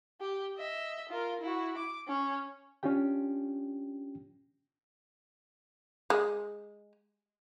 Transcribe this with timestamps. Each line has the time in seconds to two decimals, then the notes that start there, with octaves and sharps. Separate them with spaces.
0.21 G4
0.56 D#5 E5
1.09 F4 A#4
1.41 E4 F#4
1.77 D6
2.07 C#4
2.83 C#4 D4 F4 G4 G5
6.10 G#3